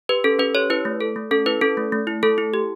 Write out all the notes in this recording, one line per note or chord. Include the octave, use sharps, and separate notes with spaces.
G4 B4
C#4 A4
C#4 B4
G4 C#5
E4 B4
A3
A4
A3
C#4 A4
E4 B4
C#4 A4
A3
A3
E4
A3 A4
E4
G4